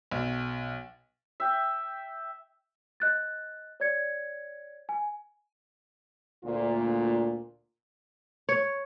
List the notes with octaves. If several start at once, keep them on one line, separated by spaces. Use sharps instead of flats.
B1
E5 G5
D#5 F#6 A6
C#5 D5 G#6 C#7
G#5
D2 A#2 F4
C#5